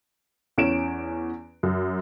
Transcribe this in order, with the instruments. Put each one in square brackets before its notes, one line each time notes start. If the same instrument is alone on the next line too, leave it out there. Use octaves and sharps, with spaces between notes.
[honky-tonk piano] E2 C#4 D7 E7
F#2